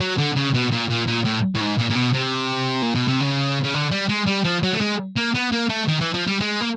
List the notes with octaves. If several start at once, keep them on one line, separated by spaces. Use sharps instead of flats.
F#3
D3
C#3
B2
A#2
A#2
A#2
A2
A2
G#2
A#2
A#2
B2
C3
A#2
B2
C3
C#3
C#3
D3
G3
G#3
G3
F3
F#3
A3
G#3
A#3
B3
A#3
A3
D#3
E3
F3
G3
G#3
A#3